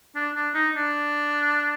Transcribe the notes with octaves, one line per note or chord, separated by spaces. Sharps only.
D4
D4
D#4
D4